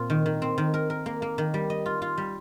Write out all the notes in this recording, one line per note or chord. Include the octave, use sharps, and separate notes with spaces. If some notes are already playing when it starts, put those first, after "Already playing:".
Already playing: A#2 C4 F4
D#3
D#3
C4
D#3
A#4
A#4
A#3
A#3
D#3
G3
D#5
F4
F4
G3